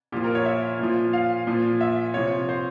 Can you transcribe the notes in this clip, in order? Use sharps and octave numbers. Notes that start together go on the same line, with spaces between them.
A#2 F3 G4
A#4
C#5
E5
A#2 F3
F5
A#2 F3
E5
C3 F3 C#5
C5